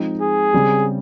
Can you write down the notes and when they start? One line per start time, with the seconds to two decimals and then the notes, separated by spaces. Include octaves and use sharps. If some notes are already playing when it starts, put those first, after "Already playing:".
Already playing: F3 G#3 C4 D#4
0.21 G#4
0.53 C#3 G3 C4 G4